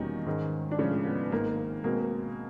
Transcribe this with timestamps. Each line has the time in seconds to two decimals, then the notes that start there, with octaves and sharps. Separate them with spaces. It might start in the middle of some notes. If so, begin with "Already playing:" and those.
Already playing: E2 B2 D#3 G3 A#3 C#4 D#4
0.26 G#2 D#3 G#3 C#4
0.71 D4
0.79 A2 C#3 F3 G#3 C#4
1.06 B3
1.31 G#1 G#2 D#3 A#3
1.84 B2 G#3 A#3 C4